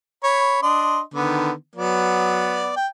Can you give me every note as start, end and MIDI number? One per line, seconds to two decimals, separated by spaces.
0.24 0.59 73
0.24 0.59 83
0.63 1.00 62
0.63 1.00 75
0.63 1.00 84
1.14 1.51 50
1.14 1.51 51
1.14 1.51 59
1.76 2.72 54
1.76 2.72 59
1.76 2.72 74
2.76 2.87 79